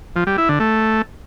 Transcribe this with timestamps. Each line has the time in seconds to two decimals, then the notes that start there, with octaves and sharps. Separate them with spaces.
0.16 F3
0.27 G3
0.38 E4
0.49 D3
0.60 A3